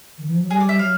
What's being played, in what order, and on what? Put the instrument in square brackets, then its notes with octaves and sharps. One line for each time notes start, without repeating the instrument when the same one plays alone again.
[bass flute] D#3
E3
F3
F#3
[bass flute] G3 [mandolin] G#4
[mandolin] D5
[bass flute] G3 [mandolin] E5
[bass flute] F#3 [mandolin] F5